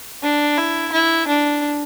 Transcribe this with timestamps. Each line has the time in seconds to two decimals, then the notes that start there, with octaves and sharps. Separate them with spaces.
0.23 D4
0.58 E4
0.93 E4
1.28 D4